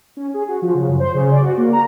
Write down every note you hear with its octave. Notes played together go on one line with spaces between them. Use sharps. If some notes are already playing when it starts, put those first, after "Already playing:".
C#4
G#4
F#4
F3
C#3
F#2
C5
C#3
D5
F#4
A#3
A#5